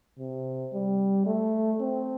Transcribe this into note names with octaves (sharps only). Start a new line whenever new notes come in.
C3
G3
A3
C4